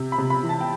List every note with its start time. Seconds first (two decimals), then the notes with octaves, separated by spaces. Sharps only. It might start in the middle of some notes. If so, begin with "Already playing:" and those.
Already playing: C3
0.12 B5
0.18 C3
0.30 B5
0.43 E3
0.49 A5
0.61 G5